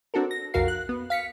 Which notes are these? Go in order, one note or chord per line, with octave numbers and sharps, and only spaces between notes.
C4 D4 F#4 A4 A#4
A#6
B1 F2 F#4 A#4 F5 C7
F#6
B3
F5 B6 C#7